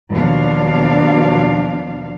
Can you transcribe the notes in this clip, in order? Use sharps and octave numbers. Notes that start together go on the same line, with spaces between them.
D#2 B2 F3 F#3 D4 F5